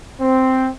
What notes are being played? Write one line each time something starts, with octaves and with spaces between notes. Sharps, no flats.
C4